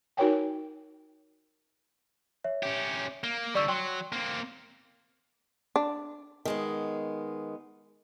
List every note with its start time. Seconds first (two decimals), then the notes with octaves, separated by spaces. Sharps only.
0.17 D#4 F#4 A#4 C#5 G5 G#5
2.44 C#5 E5
2.63 C#4 G4
3.24 A#3 G7
3.55 D3 G3 D5 C#6 E6
3.68 F#3 G5 C6
4.12 A#3 C4
5.76 D4
6.45 D#3 G#3 B3